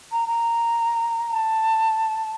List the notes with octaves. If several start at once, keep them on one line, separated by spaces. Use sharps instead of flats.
A#5
A#5
A5